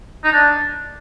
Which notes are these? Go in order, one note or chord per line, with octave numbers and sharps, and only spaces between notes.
D#4
D4